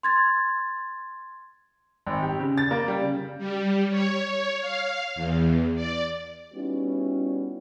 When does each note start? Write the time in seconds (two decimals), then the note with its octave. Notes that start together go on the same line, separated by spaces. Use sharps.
0.03 C6 G#6 A6
2.07 G#1
2.22 G4
2.40 C#3
2.58 A6
2.71 A#3
2.88 G3
3.02 C#3
3.38 G3
3.90 C#5
4.60 F5
5.15 E2
5.75 D5
6.53 G3 B3 C#4 D#4 E4 F#4